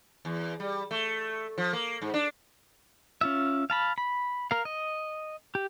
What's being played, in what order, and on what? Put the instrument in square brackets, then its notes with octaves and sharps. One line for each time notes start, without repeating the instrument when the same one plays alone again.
[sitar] E2
G3
A3
F3
A#3
G#2
D4
[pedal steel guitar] C#4 F4 E5
F5 A5 B5
B5
A#4 F5
D#5
G4